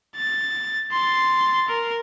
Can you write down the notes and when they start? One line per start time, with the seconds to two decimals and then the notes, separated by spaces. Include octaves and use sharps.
0.16 A6
0.92 C6 A6
1.69 A#4